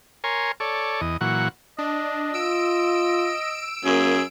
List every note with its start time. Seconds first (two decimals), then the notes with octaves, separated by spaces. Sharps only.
0.24 A#4 C#5 G#5 C6
0.60 A4 C#5 D5
1.01 E2 D#5
1.21 A#2 E3 F#3 F#5 C#6
1.78 D4 D#5
2.34 F4 E6 D7
3.85 F#2 A#3 G#4